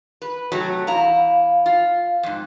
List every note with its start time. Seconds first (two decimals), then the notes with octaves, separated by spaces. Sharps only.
0.22 B4
0.52 C3 F#3 A3
0.87 E2 E4 F5 A#5
1.66 F4
2.23 F2 G#2